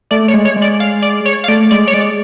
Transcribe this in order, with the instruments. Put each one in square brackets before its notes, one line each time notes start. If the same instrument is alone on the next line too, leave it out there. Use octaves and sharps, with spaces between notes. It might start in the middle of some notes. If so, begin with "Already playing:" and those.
[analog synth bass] A3 [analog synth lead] D5
[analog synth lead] C#5
[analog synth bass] G#3
[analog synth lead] C#5
[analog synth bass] G#3
[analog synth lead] D5
F5
D5
C#5
F5
[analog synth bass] A3 [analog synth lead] D5
[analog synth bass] G#3 [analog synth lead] D5
[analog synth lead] C#5
[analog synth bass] G#3 [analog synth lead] D5